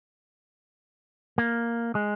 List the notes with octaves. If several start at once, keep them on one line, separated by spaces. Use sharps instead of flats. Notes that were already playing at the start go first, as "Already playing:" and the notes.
A#3
G#3